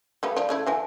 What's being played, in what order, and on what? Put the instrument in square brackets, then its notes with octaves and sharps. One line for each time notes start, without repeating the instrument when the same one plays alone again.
[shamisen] G3 A3 B3 [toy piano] G4 F5 B5
[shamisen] F3 [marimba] D5 [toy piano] A5
[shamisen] C#3 A3 E4
[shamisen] D3 E3 A3 [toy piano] E5 G#5 A5